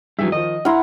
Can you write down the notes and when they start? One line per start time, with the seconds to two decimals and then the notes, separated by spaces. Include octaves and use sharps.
0.19 G2 E3 F#3 G#4 E5
0.32 D#3 F3 D#5
0.65 E4 F#5 A#5 C6 F6